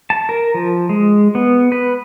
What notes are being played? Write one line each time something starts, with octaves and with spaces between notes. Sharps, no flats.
A5
A#4
F3
G#3
B3
B4